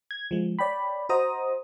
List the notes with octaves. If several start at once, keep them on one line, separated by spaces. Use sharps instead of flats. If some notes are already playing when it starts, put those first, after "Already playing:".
G#6
F3 G#3
C#5 D5 G5 B5
F#4 C5 D#5 A#5 D#6